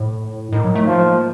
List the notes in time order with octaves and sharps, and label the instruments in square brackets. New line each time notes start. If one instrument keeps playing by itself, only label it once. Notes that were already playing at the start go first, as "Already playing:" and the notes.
Already playing: [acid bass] A2
[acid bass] A2 [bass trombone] D#3
[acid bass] F#3
A3
[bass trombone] F3 [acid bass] A#3